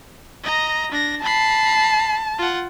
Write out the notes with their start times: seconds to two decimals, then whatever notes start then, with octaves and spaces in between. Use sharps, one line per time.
0.43 D#5 A#5
0.91 D4 A#6
1.24 A5 B5 C7
2.38 F4 F#5